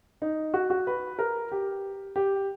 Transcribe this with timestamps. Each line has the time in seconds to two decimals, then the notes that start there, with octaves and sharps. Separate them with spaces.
0.22 D#4
0.54 F#4
0.70 F#4
0.87 B4
1.19 A#4
1.52 G4
2.16 G4